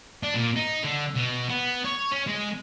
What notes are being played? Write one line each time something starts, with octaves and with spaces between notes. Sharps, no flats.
D4
A#2
D#4
D3
B2
B3
C#5
C#4
G#3